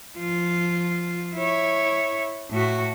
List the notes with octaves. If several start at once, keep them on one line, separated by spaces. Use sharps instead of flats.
F3 F4
E4 C#5
A2 F#4